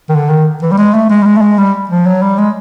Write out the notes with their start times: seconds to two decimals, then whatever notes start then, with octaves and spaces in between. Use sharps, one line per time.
0.09 D#3
0.15 D3
0.30 D#3
0.62 E3
0.72 G3
0.78 G#3
0.94 A3
1.10 G#3
1.22 G3
1.26 G#3
1.37 A3
1.41 G#3
1.58 G3
1.89 F3
2.06 F#3
2.22 G3
2.38 G#3